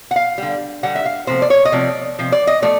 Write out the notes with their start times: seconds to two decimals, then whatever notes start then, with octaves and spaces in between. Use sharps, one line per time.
0.11 F#5
0.16 F5
0.38 D3 G3
0.83 D3 G3 F#5
0.95 E5
1.05 F5
1.27 C3 F3 A3 C5
1.42 D5
1.50 C#5
1.65 D#5
1.72 C3 F3 A3 D5
2.19 C3 F3
2.32 D5
2.47 D#5
2.62 F3 A3 D5